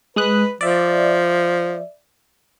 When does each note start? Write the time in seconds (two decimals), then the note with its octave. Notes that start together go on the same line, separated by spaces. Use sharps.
0.16 G#3 B4 D#6 F#6
0.61 F3 D5 E5